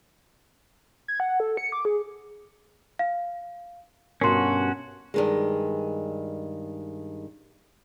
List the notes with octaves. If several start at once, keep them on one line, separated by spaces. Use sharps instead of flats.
G#6
F#5
A4
C#7
D6
G#4
F5
G2 B2 C#4 F#4 A#4 C6 C7
G2 D#3 G#3